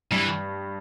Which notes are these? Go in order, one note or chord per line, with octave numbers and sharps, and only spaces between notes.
G2 E3